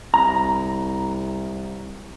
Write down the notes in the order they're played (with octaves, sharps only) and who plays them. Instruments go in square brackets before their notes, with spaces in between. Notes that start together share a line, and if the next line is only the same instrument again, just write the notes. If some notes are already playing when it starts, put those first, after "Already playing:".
[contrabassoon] C2 [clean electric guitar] A#5